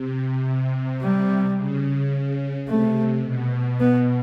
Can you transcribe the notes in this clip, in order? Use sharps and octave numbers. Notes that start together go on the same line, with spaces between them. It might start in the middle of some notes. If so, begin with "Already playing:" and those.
Already playing: C3
G3
C#3
C3 A3
B2
B3